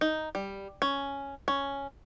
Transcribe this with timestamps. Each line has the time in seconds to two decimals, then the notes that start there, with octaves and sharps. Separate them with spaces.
0.01 D#4
0.35 G3
0.82 C#4
1.48 C#4